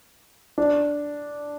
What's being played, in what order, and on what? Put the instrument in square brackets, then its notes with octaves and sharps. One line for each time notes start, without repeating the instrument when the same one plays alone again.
[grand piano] D4